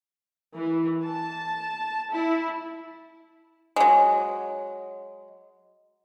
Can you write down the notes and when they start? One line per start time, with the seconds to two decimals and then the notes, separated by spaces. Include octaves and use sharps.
0.56 E3
1.03 A5
2.10 E4
3.76 F#3 G#3